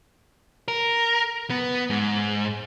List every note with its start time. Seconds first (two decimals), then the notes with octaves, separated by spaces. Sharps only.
0.68 A#4
1.50 B3
1.90 G#2